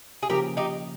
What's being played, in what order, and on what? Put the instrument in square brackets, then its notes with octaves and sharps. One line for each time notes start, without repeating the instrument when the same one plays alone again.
[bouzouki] G#4
[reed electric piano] C#3 F3 A#3 [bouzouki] G4 A#4
[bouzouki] D#4 G4